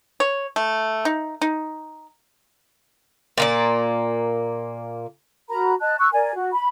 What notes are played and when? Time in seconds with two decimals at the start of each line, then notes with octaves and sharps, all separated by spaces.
0.20 C#5
0.56 A3
1.05 D#4
1.42 D#4
3.38 A#2 A#3 D5
5.49 F#4 A#4 A#5 B5
5.80 D#5 A5 F#6
6.00 C#6 E6 F#6
6.12 A#4 D5 G#5
6.34 F#4
6.52 B5